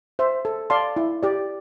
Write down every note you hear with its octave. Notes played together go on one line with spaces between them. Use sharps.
C5 E5
A4
D5 F5 A5 C6
E4
G4 D5